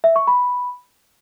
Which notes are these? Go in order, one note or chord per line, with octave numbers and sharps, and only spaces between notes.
E5
C#6
B5